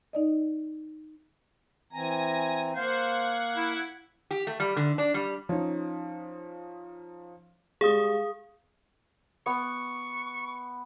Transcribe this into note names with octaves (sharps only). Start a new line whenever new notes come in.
D#4 D5 D#5
E3 C4 G#5 A#5 A#6
A#3 C5 F5 F#5 G#6
E4
G4
A3
G3
D3
D4
G3
F3 C#4 D#4
G3 G#3 G#4 F5 D#6
B3 C#6